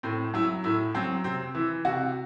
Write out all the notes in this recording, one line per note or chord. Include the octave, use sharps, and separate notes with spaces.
A2 C4
F#3 E4
A2 E4
F#3 C4
C3 C4
E3 E4
C3 F#4